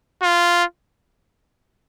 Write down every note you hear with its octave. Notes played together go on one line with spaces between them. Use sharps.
F4